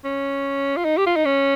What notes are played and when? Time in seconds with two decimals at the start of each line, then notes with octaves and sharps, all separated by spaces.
0.05 C#4
0.77 F4
0.85 D#4
0.98 G4
1.07 F4
1.16 D#4
1.25 C#4